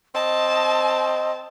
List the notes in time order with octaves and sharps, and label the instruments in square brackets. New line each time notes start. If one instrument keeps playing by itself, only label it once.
[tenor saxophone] C4 [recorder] D#5 [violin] A5